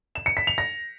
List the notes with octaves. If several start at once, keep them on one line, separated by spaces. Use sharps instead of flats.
E7
C#7
B6
F7
A#6